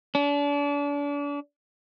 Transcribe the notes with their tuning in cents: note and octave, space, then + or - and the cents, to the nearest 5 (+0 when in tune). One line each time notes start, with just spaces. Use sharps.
D4 -35